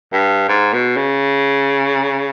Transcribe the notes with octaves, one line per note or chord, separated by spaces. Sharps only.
G2
G#2
B2
C#3